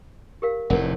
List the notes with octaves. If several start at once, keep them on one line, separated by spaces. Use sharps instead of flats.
G4 A#4 F5
F1 E2 A2 A#4 C5 F#5